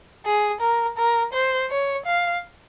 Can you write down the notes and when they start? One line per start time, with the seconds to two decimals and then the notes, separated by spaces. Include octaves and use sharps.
0.26 G#4
0.61 A#4
0.98 A#4
1.33 C5
1.70 C#5
2.06 F5